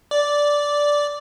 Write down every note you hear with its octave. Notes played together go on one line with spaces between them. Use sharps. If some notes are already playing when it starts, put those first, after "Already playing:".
D5